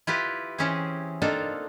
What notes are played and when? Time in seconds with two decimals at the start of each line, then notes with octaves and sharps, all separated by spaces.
0.07 E4 F4 G4 B4
0.58 E3 C4 C#4 G4 G#4
1.22 A#3 C4 D4 D#4 F4 A4